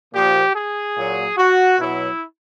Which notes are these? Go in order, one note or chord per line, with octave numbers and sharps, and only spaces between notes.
A#2 F3 G4
G#4
A#2 F#3
F#4
B2 F#3 E4